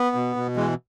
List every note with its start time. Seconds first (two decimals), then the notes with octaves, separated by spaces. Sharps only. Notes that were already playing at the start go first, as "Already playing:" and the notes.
Already playing: B3
0.15 B2
0.36 B2
0.57 E3 G#3